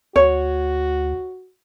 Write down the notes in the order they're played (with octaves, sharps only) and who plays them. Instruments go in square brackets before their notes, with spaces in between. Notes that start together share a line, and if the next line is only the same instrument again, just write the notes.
[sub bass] D2 [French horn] F#4 [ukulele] C#5